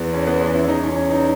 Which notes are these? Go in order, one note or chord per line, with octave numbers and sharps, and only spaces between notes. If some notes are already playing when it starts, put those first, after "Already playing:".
Already playing: E2 B3
C#4
B3
C#4
E4
E2 D#4
C#4
C#4
D#4